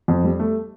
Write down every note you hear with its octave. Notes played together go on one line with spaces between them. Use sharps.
F2
G3
A3